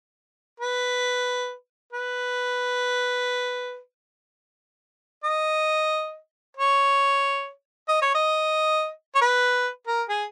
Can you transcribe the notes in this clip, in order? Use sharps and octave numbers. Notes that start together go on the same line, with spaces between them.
B4
B4
D#5
C#5
D#5
C#5
D#5
C#5
B4
A#4
G#4